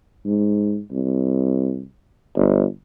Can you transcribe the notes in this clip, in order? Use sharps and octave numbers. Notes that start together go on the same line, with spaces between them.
G#2
C2
G1